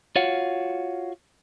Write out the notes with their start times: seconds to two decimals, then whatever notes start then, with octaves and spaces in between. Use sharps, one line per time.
0.16 F4 F#4 C#5 F5 F#5